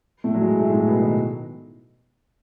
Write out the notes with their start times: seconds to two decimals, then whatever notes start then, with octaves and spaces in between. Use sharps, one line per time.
0.24 A2 A3
0.34 F#3
0.42 G#3
0.60 A2 A3
0.69 G#3
0.73 A2 A3
0.87 B2 B3
1.01 D#3 D#4